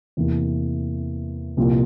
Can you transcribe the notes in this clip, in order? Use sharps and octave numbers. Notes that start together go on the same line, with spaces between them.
E2 C3 E3 A#3
C2 A#2 F3 A#3 F4